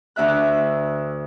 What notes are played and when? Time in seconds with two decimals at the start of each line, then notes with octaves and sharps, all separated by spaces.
0.16 D2 D4 E5 F#6